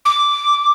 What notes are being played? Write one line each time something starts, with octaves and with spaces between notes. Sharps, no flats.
D6